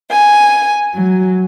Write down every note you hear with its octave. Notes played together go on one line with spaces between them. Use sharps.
G#5
F#3